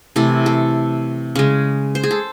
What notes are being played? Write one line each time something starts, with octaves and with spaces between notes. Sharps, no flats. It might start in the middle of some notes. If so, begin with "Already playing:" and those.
C3 E3 A3 A4
A4
C#3 G#3
C5
G#4
A4